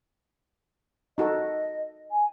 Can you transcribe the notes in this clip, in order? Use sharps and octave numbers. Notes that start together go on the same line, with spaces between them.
D#4 F#4 A4 D#5
G#5